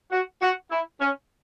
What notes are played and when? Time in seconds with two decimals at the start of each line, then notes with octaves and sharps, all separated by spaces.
0.12 F#4
0.42 F#4
0.71 E4
1.01 C#4